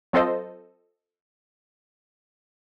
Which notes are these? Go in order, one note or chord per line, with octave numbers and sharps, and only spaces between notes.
F#3 C4 F4 A4 C5 D#5